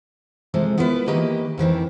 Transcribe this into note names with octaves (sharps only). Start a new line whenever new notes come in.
C3 E3 F3 G#3 A4
B3 E4 F4 A#4 B4
D#3 E3 A#3 G4 B4 D#5
F2 D#3 E3 C4